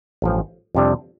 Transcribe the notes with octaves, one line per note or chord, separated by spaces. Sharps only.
A1 G2 F3
F2 C3 G3 D4